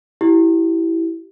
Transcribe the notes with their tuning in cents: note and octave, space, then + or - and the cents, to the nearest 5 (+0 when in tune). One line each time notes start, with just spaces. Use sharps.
E4 +0 G4 -25